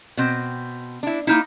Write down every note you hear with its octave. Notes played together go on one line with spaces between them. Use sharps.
B2 C4
D4 E4
A#3 D#4 E4